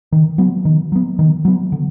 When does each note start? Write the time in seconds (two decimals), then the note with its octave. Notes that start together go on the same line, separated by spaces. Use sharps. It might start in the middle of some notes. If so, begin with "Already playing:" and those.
0.12 D#3
0.38 F#3 B3
0.65 D#3
0.92 F#3 B3
1.19 D#3
1.45 F#3 B3
1.72 D3